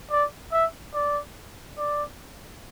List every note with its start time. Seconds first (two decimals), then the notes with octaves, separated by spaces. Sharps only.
0.11 D5
0.53 E5
0.94 D5
1.78 D5